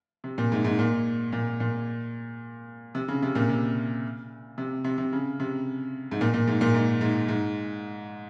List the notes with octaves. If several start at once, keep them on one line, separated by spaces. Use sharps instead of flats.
C3
A#2
G#2
G#2
A#2
A#2
A#2
C3
C#3
C3
A#2
C3
C3
C3
C3
C#3
C3
G#2
A#2
A#2
G#2
A#2
G#2
G#2
G#2